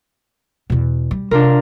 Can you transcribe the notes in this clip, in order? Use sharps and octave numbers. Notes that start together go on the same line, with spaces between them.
E2 B2
G3
C3 D4 F4 A#4